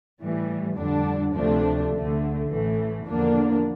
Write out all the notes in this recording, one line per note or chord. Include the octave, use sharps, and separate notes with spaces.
A2 E3 G3
F2 D3 G3 D4
D2 C3 F3 A3 D4
D2 D3 A3
A1 A2 E3 A3
E2 D3 F3 A#3 D4